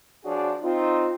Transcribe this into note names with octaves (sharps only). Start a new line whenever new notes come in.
F3 D4 F#4 G#4 C#5 D5
C4 D#4 F4